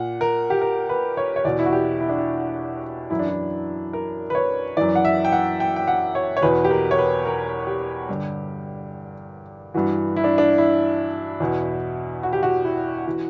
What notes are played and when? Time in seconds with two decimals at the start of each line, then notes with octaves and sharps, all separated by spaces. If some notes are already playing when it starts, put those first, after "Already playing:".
Already playing: A#2 F#5
0.21 A#4
0.50 G4
0.61 A#4
0.89 B4
1.17 C#5
1.36 C#5
1.45 E2 B2 D5
1.59 E4
1.66 F#4
1.73 G4
2.00 E4
2.09 D4
2.17 E4
3.10 F#2 E3 E4
3.19 D4
3.29 E4
3.93 A#4
4.30 B4
4.35 C#5
4.77 F#2 E3 D5
4.95 F#5
5.05 E5
5.25 G5
5.32 F#5
5.60 G5
5.76 G5
5.88 F#5
6.15 C#5
6.37 C#5
6.42 E2 B2 B4
6.64 G4
6.71 A#4
6.91 C#5
6.99 B4
7.26 A#4
7.67 G4
8.09 G2 D3
9.74 G2 E3 F#4
10.16 E4
10.24 D4
10.38 D4
10.58 E4
11.40 E2 B2
12.23 F#4
12.33 G4
12.43 F#4
12.64 E4
13.06 E3 F#4